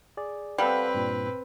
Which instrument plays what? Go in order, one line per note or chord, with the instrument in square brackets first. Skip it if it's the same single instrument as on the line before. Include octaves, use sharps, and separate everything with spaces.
[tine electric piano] G#4 D5
[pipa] G3 [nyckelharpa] C4 B4 [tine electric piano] A4 F5 F#5
[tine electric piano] G2 A#2